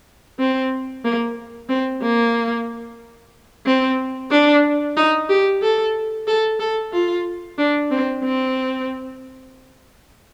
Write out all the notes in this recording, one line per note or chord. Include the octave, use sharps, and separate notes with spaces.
C4
A#3
C4
A#3
C4
D4
D#4
G4
A4
A4
A4
F4
D4
C4
C4